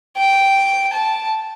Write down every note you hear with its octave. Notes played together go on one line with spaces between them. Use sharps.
G5
A5